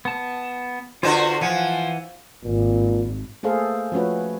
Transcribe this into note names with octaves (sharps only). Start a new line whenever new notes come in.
B3 A5
D3 F4 F#4 A4 B4 C5
E3 F3 F#5 G#5
G#1 A#2
A3 A#3 G#4 A4 C5 F5
F3 A3 C#4 F#4 B4